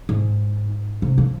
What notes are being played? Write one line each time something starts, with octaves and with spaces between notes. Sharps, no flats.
G#2
C3
F3